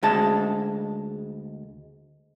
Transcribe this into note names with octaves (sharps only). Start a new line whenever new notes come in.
D2 G#3 A5